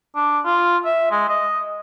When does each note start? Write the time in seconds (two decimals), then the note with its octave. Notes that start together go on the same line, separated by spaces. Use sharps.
0.16 D4
0.45 F4
0.86 E5
1.11 G#3
1.29 D#5